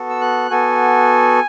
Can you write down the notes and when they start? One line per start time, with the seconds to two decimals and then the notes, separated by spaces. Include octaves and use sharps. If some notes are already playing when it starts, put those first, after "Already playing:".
Already playing: B3 F#4 A4
0.10 E6
0.21 F#6
0.50 B3 F#4 A4 G#5